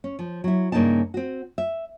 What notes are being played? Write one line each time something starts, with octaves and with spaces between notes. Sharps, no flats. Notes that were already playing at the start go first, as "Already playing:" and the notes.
C#4
F3
F#3 E4
G2 C#3 A#3 C#4 D#4 A5
C4 F#4
E5